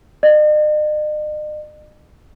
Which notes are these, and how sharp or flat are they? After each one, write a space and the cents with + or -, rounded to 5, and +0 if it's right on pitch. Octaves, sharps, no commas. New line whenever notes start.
D#5 -45